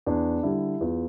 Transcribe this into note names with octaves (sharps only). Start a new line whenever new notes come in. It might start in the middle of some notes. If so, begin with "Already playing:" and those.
E2 D4
D3 G3 E4
E2 F4